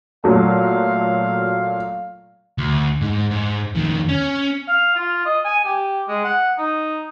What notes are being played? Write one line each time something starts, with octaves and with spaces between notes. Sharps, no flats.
A#2 F#3 A3 F5
D2
G#2
G#2
F2 D#3
C#4
F5
F4
D#5
G#5
G4
G#3
F#5
D#4